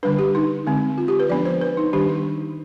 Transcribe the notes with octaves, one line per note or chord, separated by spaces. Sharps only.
D3 G3 D4 B4
G4
D#4
D3 G#3 C4
F4
G4
B4
F3 B3 D4 D5
C5
B4
D#4
D#3 G3 D4 G4
D#4